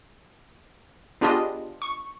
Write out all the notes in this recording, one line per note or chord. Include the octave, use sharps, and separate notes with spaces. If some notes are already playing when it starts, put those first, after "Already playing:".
B3 D4 F4 G4 G#4 D#5
C#6